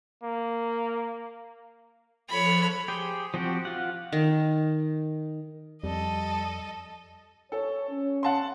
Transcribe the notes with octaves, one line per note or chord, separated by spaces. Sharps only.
A#3
F3 A4 C#5 B5 F#6
G4 G#4 C5
F3 C4 F#4 G4
F4 F#5
D#3
F2 G3 A4 D#5
A4 C#5
C#4
F#5 A5 C6